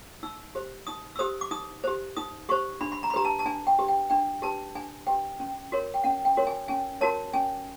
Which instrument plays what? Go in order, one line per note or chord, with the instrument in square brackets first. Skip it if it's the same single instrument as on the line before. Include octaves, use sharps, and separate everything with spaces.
[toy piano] D#4 E6
G4 C5
D#4 D#6
E6
G4 C5 D#6
D6
D#4 D#6
G4 C5
D#4 D#6
G4 C5 C#6
D4 B5
B5
A#5
B5
G4 B4 A#5
A5
A5
D4 G#5
G5
G4 B4
G5
D4 G5
G4 B4 A5
D4 G#5
G4 B4 G5
C#4
F#4 A#4 C#5
G5
C#4 F#5
G5
F#4 A#4 C#5
G#5
C#4 G#5
F#4 A#4 C#5 A5
C#4 G#5